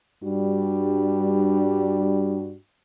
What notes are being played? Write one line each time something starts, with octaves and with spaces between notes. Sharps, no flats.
G2 G3 D4 F#4